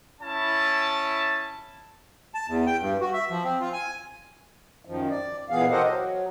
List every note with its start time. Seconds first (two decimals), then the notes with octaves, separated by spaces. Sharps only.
0.21 C#4 E4 A5
2.35 A5
2.48 E2
2.67 G5
2.81 G2
3.01 F#4
3.13 E5
3.30 F3
3.44 C4
3.61 F4
3.73 G#5
4.85 F#2 D#3 F3
5.10 D5
5.50 A#2 E3 B3 G#4 F5
5.70 G4 A4 A#4 C5 D#5 F#5
5.85 F#3